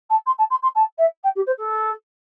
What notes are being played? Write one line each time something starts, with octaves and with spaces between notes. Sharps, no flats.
A5
C6
A5
C6
C6
A5
E5
G5
G4
C5
A4